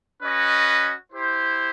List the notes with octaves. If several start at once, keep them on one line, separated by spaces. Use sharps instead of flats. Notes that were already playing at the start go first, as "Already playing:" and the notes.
C#4 F#4 B4 D#5
E4 G4 C5